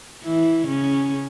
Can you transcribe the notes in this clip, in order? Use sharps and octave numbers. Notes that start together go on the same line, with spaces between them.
E3 E4
C#3 C#4